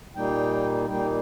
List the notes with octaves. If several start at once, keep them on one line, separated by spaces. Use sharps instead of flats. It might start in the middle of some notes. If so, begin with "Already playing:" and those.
A#2 G3 A#3 D#4 G5
A#2 G3 A#3 D#4 G5